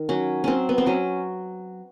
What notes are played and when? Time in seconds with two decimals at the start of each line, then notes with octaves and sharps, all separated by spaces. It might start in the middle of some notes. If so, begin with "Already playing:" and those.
Already playing: D#3
0.09 F#3 C#4
0.44 F#3 C4 C#4
0.69 B3
0.78 C4
0.86 F#3 C#4